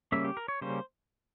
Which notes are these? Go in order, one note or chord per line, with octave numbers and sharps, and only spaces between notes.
C#3 G3 A#3 C#4 E5
G4
A#4
C#5
C#3 G3 A#3 C#4 C5